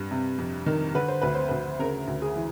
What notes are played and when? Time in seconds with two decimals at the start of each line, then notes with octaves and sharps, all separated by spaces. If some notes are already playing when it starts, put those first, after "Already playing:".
Already playing: G2
0.11 C3
0.38 F2
0.66 D#3
0.95 D3 B4
1.08 C5
1.22 D2 B4
1.35 C5
1.49 D2 B4
1.79 C#3 A#4
2.08 D2
2.22 G#4
2.36 E3